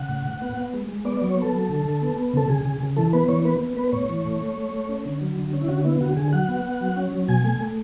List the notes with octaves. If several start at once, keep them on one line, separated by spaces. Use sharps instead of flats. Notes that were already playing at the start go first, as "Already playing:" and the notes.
Already playing: C#3 F#5
A2
A2
B3
B3
G#3
G#3
B3 D5
D5
F#3
C#5
B3 A4
F#3
D3
D3
B3
B3
C#3 A4
C#3 G#4
C#3
C#3
E3 A4
B3 B4
E3 C#5
B3 B4
B3
B3 B4
A2 C#5
E3
A3
A3
A3
A3
C#4
D3
F#3
D3
C#4
E4
D3 F#4
B3 E4
D3 F#4
D3 G#4
F#3 F#5
B3
B3
F#3
C#4
F#3
B2 G#5
A3
A3